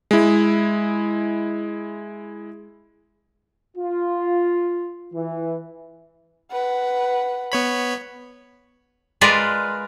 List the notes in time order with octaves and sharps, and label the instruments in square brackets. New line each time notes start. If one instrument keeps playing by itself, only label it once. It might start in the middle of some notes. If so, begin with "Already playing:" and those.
[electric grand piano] G#3 E4
[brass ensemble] F4
E3
[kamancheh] B4 F#5
[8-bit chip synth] B3 C#5 B5
[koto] G#3 F4 A#4 B4 D5